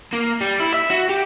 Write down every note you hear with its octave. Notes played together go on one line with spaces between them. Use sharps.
A#3
G3
E4
E5
F#4
G4